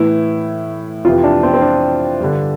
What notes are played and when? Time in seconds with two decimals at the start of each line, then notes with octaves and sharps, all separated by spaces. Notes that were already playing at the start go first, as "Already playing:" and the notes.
Already playing: A2 E3 E4
1.05 F2 C3 E3 F4
1.24 D4
1.43 C4
1.54 C4
1.62 D4
2.20 G2 D3